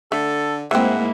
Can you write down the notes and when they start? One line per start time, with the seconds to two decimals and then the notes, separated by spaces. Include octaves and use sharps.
0.12 D3 A3 A4
0.71 G#2 E3 G#3 A#3 C4 E4 F#5